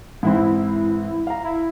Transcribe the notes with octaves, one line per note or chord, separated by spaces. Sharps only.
G#2 E3 C4 E4
F5 A#5
E4